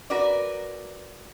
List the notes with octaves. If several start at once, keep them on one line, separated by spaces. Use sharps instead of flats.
F#4 A#4 B4 D5